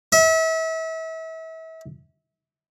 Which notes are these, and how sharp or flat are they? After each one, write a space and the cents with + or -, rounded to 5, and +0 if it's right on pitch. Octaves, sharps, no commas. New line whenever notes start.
E5 -35